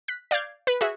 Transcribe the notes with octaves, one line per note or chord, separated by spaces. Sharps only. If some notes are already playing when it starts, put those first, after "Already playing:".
F#6 B6
D5 F5 D6 G6 G#6
B4 B5
F#4 G#4 E5